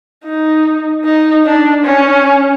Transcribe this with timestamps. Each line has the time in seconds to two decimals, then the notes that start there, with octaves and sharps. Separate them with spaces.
0.24 D#4
1.05 D#4
1.45 D4
1.85 C#4